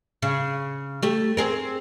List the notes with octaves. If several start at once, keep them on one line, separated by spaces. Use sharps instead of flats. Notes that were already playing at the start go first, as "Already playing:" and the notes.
C#3
A3 G4
C4 G#4 A#4